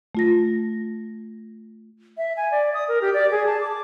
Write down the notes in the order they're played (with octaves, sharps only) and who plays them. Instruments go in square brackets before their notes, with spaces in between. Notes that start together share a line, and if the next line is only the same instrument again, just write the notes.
[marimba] A3 F4 A#6
[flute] E5
G#5
D5
D#6
A#4
G4
D5
G#4
A5
D6